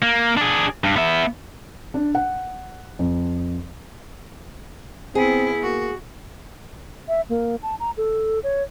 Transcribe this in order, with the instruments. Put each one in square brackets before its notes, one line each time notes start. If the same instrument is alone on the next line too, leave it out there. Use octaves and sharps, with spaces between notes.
[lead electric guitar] A#3
D4 G#4
G2
B3 E5
[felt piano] D4
F#5
F2
[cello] B3 E4 [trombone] C4 [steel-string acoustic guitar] G#4
[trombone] A#3 [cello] F#4
[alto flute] E5
A#3
A5
A#5
A4
C#5